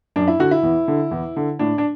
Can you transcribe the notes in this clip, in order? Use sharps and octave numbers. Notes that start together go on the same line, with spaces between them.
F#2 D4
E4
D3 F#4
E4
E2
D3
E2
D3
A2 D4
D4